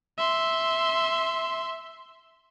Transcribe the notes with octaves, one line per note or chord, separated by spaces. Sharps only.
E5 C6